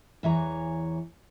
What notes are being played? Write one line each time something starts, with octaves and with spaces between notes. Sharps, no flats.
E2 E3 C#5 A#5